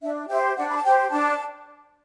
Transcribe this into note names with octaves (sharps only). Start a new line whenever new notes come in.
D4 E5
G4 C5 E5
D4 F#5
B5
A5
G4 C5 G5
D4 A5